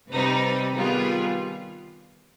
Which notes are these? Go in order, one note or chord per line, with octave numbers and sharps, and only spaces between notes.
C3 G3 C4 D#4 B4
D#3 G3 B3 F4 G#4